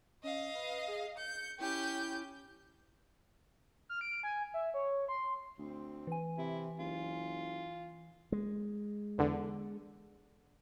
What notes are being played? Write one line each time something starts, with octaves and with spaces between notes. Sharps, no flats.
C#4 D#5 F5
B4
G#4
G6 C#7
C#4 E4 G4 G6
F6
D7
G#5
E5
C#5
C6
D2 C4
E3 G#5
C3 E4
F#1 F4
G#3
E2 D3